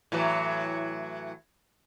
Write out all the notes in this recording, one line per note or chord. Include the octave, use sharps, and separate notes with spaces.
A2 E3 F#3